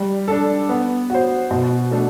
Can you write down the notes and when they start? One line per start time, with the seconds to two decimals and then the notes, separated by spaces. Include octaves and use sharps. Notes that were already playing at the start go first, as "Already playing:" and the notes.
Already playing: G3
0.28 D4 A4
0.69 B3
1.10 F#4 C5
1.51 B2
1.91 A3 D4 A4